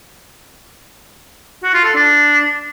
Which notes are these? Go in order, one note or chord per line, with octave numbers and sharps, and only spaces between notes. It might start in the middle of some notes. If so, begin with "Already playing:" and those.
F#4
F4
A4
D4